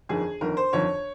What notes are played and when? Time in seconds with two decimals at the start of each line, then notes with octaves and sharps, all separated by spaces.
0.09 G1 F2 D#3 G#4
0.41 G1 F2 D#3 A#4
0.57 C5
0.73 G1 F2 D#3 C#5